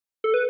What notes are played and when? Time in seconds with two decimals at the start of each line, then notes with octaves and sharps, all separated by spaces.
0.24 A4
0.34 B4